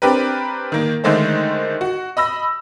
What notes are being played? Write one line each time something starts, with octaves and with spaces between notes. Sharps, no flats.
C4 D4 G4 A#4 B4
D#3 A#3
D3 D#3 G#3 A3 D#4 C5
F#4
D#5 B5 E6 A#6